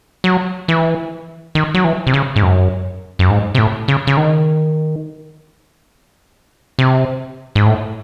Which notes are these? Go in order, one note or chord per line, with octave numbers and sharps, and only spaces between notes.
F#3
E3
D#3
F#3
E3
C3
C#3
G#2
F#2
F#2
G#2
C3
A2
C#3
C#3
D#3
C3
G#2
A2